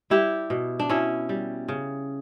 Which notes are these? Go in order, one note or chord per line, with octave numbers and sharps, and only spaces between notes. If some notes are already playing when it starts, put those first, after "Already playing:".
G3 E4 G4
B2
D4
B2 C#4 E4
G3
C#3